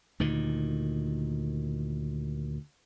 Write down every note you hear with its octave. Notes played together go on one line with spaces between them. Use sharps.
D2 A#2 D#3